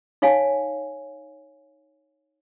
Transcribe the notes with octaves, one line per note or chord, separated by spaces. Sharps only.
D#4 C#5 F5 G#5